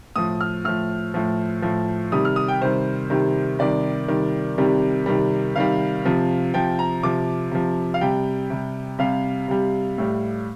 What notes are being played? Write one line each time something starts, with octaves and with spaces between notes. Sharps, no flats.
A2 F3 D#6
F6
A2 F3 F6
A2 F3
A2 F3
C3 D#3 G3 D#6
F6
D#6
G5
C3 D#3 G3 C5
C3 D#3 G3
C3 D#3 G3 D5
C3 D#3 G3
C3 D#3 G3
C3 D#3 G3
C3 D#3 G3 F5
C3 F3
C3 F3 G5
A#5
C3 F3 D6
C3 F3
F5
C3 G3 G5
C3 G3
C3 G3 F5
C3 G3
A2 G3